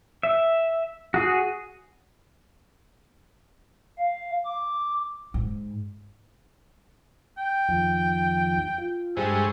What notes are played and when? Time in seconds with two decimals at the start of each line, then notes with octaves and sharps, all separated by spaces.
0.23 E5
1.14 F#4 G#4
3.98 F5
4.45 D6
5.34 G#2
7.38 G5
7.69 F2 D#3 F3
8.78 F4
9.17 G2 G#3 A4 C5 C#6